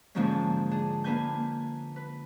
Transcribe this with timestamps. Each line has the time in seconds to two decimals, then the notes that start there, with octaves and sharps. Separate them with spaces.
0.15 G#2 D3 F3 G#3 A#3 C#4
0.71 D4 G#4
1.04 A#3 D4 B4 G#5 G6
1.96 B4